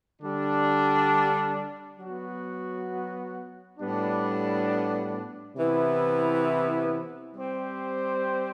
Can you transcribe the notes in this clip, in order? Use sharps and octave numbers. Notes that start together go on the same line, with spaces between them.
D3 G3 D4
F#3 B3 F#4
A2 G3 B3 D4
C3 E3 B3 E4
G3 C4 G4 C5